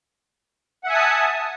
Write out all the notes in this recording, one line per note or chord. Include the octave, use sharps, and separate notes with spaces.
E5 F#5 G#5 A5 D#6